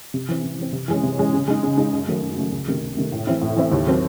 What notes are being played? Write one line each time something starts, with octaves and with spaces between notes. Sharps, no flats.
C3
E3 C4
C3
E3 C4
C3
E3 G#3 C#4
C3
E3 G#3 C#4
C#3
G#3 D#4
C#3
G#3 D#4
F#2
D#3 F#3 A3
F#2
D#3 F#3 A3
C#2
C3 D#3 A3
C#2
C3 D#3 A3
A2
E3 C4 E4
A2
E3 C4 E4
D#2
D#3 F#3 C4